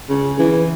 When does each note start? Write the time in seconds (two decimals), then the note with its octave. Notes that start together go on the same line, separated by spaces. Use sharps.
0.09 C#3
0.39 E3